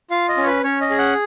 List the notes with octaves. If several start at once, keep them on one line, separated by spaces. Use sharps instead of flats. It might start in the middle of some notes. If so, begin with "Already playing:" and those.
F4 F5
D#5
C#4
C#5
B4
C#4 C#5
D#5
G#4
F#5